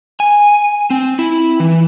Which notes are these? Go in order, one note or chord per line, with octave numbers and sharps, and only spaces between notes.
G#5
C4
E4
E3